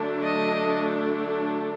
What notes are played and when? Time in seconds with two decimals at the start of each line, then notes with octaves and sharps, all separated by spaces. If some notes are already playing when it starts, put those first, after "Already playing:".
Already playing: D3 F#3 A3 D4
0.23 D#5